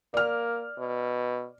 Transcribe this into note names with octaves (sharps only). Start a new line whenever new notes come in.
A#3 D5 F6
B2